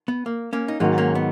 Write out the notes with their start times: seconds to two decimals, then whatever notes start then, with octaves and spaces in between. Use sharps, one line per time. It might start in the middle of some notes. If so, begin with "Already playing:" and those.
0.08 B3
0.26 A#3
0.53 A#3 C#4
0.68 D#4
0.80 G#2 D#3 F#3 A#3 C#4
0.98 A#3 C#4
1.15 B3